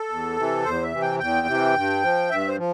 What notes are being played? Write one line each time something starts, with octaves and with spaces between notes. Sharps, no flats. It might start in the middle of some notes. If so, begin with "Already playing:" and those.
Already playing: A4
E2
C3 E3
E2 C5
E5
C3 E3
G5
E2 G5
C3 E3
G2
F3
G2 E5
C5
F3